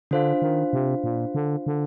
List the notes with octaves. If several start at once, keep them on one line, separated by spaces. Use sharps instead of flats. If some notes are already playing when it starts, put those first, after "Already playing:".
D3 D4 F4 C5 F5
D#3
C3
A#2
D3
D3